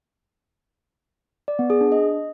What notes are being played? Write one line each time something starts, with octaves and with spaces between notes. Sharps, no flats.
D5
B3
G#4
D4
D#5